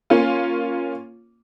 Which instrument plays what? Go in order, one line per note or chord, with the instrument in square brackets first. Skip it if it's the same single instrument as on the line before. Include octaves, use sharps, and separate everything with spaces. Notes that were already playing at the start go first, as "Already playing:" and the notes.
[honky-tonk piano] A#3 C#4 F4